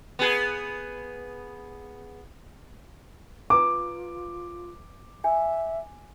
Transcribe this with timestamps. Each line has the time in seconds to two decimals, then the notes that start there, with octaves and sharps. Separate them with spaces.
0.19 B3 G#4
3.50 F4 B4 A#5 D6
5.24 E5 G#5